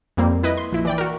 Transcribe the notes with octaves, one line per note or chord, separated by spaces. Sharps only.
F2 G3 A#3 C4
E4 B4 D#5
C6
A#1 E4
E3 D5 G5
F#4 A#4